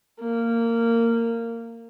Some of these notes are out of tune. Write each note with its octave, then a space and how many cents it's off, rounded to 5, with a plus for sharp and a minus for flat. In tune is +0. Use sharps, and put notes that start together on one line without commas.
A#3 -15